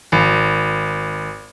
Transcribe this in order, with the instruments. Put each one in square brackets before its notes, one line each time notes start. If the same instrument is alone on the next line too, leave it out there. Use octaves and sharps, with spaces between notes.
[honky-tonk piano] G#1